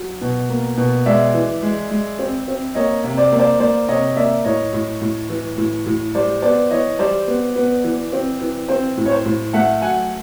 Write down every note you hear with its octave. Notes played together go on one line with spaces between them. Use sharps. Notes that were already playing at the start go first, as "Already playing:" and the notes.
Already playing: F#3
B2
A#3
B2
G#3 D5 E5
E3
G#3
G#3
C4
C4
A#3 C#5 D#5
C3
C5 D5
A#3
C5 D5
A#3 C5 D5
C3 C#5 D#5
A#3 D5 E5
A2 C#5 D#5
A2
A2
E3
A2
A2
G3 C5 D5
B3 C5 D5
E3 C#5 D#5
G3 C5 D5
B3
B3
E3
C4
E3
C4 C5
A2
C#5
C5
A2
A3 E5 F#5
F#3 F#5 G#5